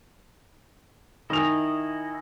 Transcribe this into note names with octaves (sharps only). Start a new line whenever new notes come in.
D#3 E4 D#5 G#5 F7